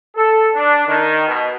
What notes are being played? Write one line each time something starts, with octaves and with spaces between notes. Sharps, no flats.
A4
D4
D#3
B2